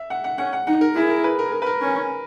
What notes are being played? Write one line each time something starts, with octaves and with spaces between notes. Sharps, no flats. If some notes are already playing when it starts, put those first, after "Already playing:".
Already playing: E5
F#5
F#5
C#4 F#5
F#5
D#4 F#5
A#4
E4 G#4
A#4
B4
A#4
A#4
B4
A#4
C#4